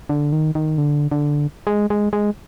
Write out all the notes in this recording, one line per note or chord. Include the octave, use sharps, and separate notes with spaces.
D3
D#3
D#3
D3
D3
G#3
G#3
G#3